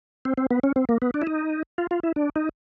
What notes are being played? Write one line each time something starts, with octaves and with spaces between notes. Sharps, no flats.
C4
C4
B3
C#4
C4
A#3
B3
D4
E4
D#4
F4
F4
E4
D4
D#4